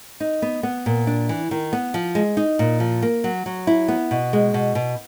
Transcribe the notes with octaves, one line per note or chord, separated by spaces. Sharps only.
D#4
B3
B3
A#2
D4
E3
D#3
B3
F3
G#3
D#4
A#2
F3
A#3
F#3
F#3
E4
B3
B2
G#3
B2
B2